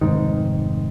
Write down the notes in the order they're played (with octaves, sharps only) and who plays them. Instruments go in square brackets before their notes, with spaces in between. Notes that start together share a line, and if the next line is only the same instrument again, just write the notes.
[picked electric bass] F1 B1 G#2 D#3